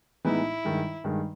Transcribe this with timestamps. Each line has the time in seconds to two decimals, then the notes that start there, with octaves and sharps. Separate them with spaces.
0.24 A2 E3 G#3 B3 D#4 E4
0.65 G2 D#3 G#3
1.04 G2 D#3 G#3